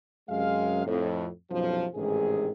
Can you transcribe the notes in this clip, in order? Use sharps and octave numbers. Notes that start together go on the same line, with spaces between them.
F#2 C3 G#3 F5
F2 A2
B1 F#2 A2 C3 F3
A1 G#2 C3 D#3 G#4